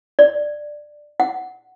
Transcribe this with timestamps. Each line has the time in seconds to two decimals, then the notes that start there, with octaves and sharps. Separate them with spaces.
0.19 D5
1.20 F#5